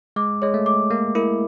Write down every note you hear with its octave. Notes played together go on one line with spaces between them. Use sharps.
G#3 D6
G#3 C#5
A3
D6
A#3 A#4
E4 A#4